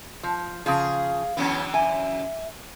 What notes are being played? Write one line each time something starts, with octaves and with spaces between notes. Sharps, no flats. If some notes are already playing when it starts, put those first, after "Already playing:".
F3
C#3 F3 G#4 F5
F#2 D3 E3 B3 C#4
E5 G#5